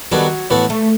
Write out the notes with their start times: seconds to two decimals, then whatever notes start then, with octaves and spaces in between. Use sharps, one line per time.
0.11 D#3 F#3 G3 B3 F#4 A4
0.50 A2 E3 B3 F#4 A4
0.70 A3